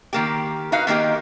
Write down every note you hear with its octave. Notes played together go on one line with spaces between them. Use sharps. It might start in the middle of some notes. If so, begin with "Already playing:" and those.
D#3 A#3 G4
D#4 F#4 B4 F5
D#3 A#3 D#4 G4